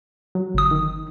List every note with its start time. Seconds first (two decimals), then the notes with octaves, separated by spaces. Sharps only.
0.35 F#3
0.54 G1 D#6
0.71 D#3